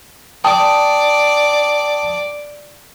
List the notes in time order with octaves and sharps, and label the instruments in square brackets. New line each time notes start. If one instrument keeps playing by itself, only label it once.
[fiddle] D5 [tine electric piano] G5 A5 D#6